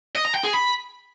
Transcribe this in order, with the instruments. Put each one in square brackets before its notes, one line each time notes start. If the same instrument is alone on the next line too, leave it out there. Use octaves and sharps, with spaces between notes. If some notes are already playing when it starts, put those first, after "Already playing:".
[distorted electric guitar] D#5
A#5
G5
G#4
B5